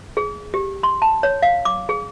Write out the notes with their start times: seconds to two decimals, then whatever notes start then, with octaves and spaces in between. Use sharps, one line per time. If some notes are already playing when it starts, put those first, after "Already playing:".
0.17 G#4
0.54 G4
0.83 C6
1.02 A5
1.23 C#5
1.42 F5
1.65 D6
1.89 G#4